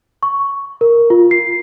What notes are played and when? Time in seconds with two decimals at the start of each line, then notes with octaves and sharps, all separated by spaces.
0.23 C#6
0.81 A#4
1.10 F4
1.31 C7